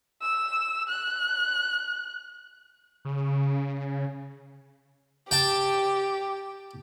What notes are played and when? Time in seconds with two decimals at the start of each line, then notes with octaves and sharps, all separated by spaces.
0.22 E6
0.89 F#6
3.05 C#3
5.31 G4 G5 A5